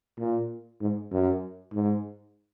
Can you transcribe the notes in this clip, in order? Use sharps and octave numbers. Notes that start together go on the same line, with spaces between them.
A#2
G#2
F#2
G#2